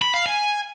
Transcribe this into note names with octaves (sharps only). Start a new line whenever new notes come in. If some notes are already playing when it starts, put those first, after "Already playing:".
B5
F5
G#5